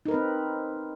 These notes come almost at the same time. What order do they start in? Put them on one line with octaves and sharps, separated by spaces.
D#4 A#4 B4 C4